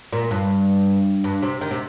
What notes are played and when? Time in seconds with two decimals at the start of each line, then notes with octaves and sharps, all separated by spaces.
0.13 A#2
0.31 G2
1.24 G2
1.42 C3
1.61 D#3
1.71 C3